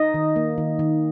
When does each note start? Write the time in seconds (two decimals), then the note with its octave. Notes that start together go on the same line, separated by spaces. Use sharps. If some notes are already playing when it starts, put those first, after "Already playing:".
Already playing: D#4 D#5
0.14 D#3
0.36 A#3
0.58 D#3
0.79 D#3